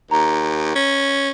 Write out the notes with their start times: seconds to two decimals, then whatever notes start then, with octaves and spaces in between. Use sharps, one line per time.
0.11 D#2 A#5
0.75 C#4